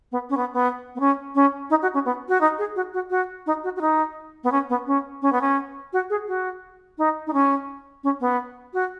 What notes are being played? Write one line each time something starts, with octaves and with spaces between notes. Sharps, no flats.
B3
C#4
B3
B3
B3
C#4
C#4
D#4
F#4
C#4
B3
F#4
D#4
G#4
F#4
F#4
F#4
D#4
F#4
F#4
D#4
B3
C#4
B3
C#4
C#4
B3
C#4
F#4
G#4
F#4
D#4
D#4
C#4
C#4
B3
F#4